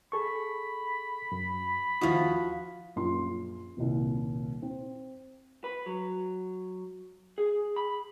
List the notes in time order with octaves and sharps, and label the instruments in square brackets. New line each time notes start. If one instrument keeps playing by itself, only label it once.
[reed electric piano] G#4 A4 C#6 [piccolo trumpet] B5
[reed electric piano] F#2
[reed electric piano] D#2 E4 D#6 [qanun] F3 F#4
[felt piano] A#1 F#2 F4 C6
D#1 C2
C4
[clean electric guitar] B4
F#3
G#4
B5